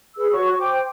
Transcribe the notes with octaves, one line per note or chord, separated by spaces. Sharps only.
G#4 B4 E6
F#4 C#5 C#6
C5 G5 D6